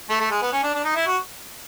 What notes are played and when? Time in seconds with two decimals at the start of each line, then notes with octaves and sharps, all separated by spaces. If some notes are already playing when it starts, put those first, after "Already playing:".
0.10 A3
0.20 A3
0.31 G#3
0.42 B3
0.53 C#4
0.63 D4
0.74 D4
0.85 D#4
0.96 E4
1.07 F#4